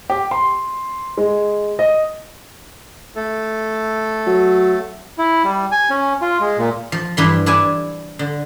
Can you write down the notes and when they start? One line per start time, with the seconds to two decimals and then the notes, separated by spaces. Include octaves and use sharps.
0.10 G4
0.31 C6
1.18 G#3
1.79 D#5
3.16 A3 A4
4.27 F#3
5.18 E4
5.44 G3
5.72 G#5
5.90 C#4
6.22 F4
6.40 G#3
6.58 A#2
6.92 F3
7.17 G2 E3 C6
7.46 D4 E4 G#5
8.19 D3